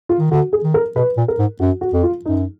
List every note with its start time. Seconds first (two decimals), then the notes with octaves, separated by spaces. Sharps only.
0.09 F4
0.19 D#3
0.31 D3 F#4
0.53 G#4
0.64 D#3
0.74 A#4
0.96 B2 B4
1.17 A#2
1.28 A#4
1.39 G#2
1.60 F#2 F#4
1.81 F#4
1.93 F2
2.03 F4
2.25 F#2 D#4